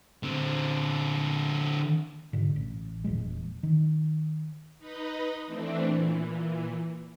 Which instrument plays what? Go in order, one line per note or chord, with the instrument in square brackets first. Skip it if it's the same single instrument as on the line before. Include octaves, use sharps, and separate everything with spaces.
[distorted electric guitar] D3 C4
[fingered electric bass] G#2 B2 D3
A1
E1 A#2 F3 G#3
D#3
[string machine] D#4 B4 D#5
E3 A3 C4 D4
A#2 E3